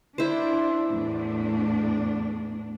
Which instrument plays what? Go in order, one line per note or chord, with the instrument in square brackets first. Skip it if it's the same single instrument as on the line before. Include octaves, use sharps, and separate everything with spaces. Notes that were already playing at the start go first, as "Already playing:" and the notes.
[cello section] D4 [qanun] E4 C5
[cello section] E2 A2 D4